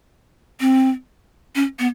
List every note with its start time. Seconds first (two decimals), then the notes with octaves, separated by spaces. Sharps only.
0.60 C4
1.55 C#4
1.79 B3